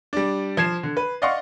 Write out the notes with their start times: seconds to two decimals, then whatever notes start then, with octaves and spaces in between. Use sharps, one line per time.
0.13 G3 D4
0.57 F3 G#6 C7 E7
0.83 D3
0.97 B4
1.22 D5 D#5 F5 F#5 C6 C#6